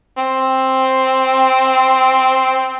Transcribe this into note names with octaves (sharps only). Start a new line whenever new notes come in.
C4